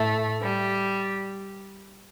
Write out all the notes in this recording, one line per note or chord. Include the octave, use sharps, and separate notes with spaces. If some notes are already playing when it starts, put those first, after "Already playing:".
Already playing: A2 A3
G3